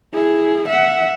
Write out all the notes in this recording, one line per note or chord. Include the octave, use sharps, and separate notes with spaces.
E4 G#4
E5 F#5